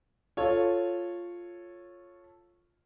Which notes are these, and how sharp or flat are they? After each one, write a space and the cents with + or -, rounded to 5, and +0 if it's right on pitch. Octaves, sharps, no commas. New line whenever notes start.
F4 +0 A4 +0 C#5 -10